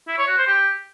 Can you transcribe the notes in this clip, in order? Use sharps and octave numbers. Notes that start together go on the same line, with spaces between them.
E4
C#5
F#4
C5
G4